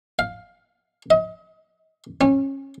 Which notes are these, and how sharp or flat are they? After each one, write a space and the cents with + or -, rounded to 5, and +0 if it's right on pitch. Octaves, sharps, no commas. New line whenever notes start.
F5 +10
D#5 +35
C#4 -25